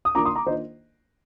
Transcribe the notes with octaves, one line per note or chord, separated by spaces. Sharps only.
D#6
D#3 A#3 D4 F4 A#5 D6
C6 D#6
A#5 D6
D#3 A#3 D4 F4 C5 D#5